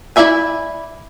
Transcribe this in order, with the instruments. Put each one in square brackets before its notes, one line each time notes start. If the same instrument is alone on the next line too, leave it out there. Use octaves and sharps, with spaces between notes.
[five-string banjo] E4 F4 D5 E5 G#5